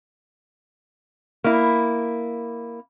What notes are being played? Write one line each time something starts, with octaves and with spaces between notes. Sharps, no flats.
A#3 E4